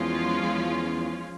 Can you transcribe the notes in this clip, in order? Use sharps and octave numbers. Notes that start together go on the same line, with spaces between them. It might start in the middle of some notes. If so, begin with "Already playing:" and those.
Already playing: E2 F3 G#3 C#4 F4
E2